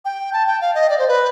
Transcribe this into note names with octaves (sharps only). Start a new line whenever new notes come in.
G5
A5
G5
F5
D#5
D5
C5
B4